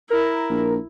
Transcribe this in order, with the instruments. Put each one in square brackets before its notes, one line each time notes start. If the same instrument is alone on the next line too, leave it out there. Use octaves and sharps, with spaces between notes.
[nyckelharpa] E4 [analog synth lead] A#4
[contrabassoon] A#1